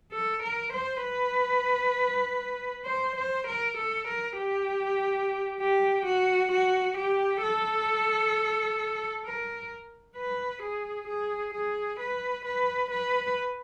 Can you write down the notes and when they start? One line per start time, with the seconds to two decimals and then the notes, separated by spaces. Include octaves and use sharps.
0.12 A4
0.43 A#4
0.73 C5
1.04 B4
2.85 C5
3.16 C5
3.47 A#4
3.77 A4
4.08 A#4
4.38 G4
5.61 G4
6.06 F#4
6.52 F#4
6.97 G4
7.43 A4
9.25 A#4
10.17 B4
10.62 G#4
11.08 G#4
11.54 G#4
12.00 B4
12.45 B4
12.91 B4